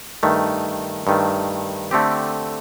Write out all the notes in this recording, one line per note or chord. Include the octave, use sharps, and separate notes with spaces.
G2 D#3 A3
G2 D#3 A3
D3 A3 C4 G4